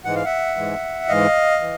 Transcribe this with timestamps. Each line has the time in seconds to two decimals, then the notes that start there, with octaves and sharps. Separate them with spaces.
0.05 G#2 E3 G#3 F#5
0.15 F5
0.25 E5 F#5
0.57 G#2 E3 G#3
1.08 G#2 E3 G#3 D#5 F5
1.61 E3